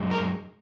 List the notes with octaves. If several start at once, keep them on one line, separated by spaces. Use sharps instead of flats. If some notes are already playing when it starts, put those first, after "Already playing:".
Already playing: F#2 G#3
A#4